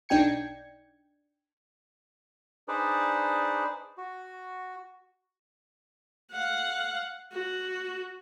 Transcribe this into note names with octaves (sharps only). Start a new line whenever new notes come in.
B1 D4 D#4 G5 G#6 C#7
D4 D#4 G#4 B4 C5 D5
F#4
F5 F#5
F#4